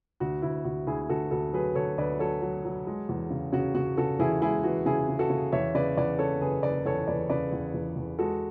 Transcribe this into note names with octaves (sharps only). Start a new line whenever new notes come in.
D2 F#4
D2 E4
D2 F#4
D2 E4 G#4
D2 F#4 A4
D2 F#4 A4
F#3 G#4 B4
D2 A4 C#5
D2 B4 D5
F#3 A4 C#5
F#3
F#3
G#3
E2
C#3
C#3 F#4
C#3 F#4
C#3 F#4 A4
E2 E4 G#4
G#3 E4 G#4
E3 F#4
C#3 E4 G#4
C#3
F#4 A4
C#3
E2 C#5 E5
C#3 B4 D5
E2 B4 D5
C#3 A4 C#5
F#1 G#4 B4
F#1 B4 D5
E2 A4 C#5
E2 B4 D5
C#3 B4 D5
E2
E2
E2
G#3 F#4 A4